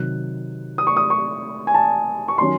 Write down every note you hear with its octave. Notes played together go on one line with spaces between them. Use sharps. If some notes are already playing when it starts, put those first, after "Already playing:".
Already playing: C3 D#3 F#3 F#6
D#6
C#6
D#6
C#6
G#5
A5
C#6
D#3 F#3 C#4 C6